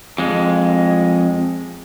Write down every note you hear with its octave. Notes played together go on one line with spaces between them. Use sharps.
F2 G#3